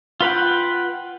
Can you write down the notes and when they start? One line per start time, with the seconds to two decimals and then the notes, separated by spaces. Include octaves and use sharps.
0.21 F4 B4 F#5 G5